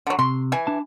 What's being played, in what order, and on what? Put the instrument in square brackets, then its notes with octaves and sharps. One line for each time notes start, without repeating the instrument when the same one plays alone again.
[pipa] D3 F#3
[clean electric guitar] C3 [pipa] C6
[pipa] E3 G#5
[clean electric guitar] D4 A5